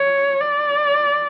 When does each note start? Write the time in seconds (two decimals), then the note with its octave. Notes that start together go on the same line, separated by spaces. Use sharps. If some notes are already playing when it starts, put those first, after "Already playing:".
Already playing: C#5
0.41 D5